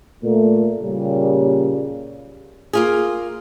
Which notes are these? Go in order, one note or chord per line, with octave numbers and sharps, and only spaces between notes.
A#2 A3
A#2 C#3 G3
A#3 F4 G#4